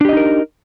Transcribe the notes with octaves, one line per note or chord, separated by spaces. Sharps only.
D4 D#4 G4 A#4 D#5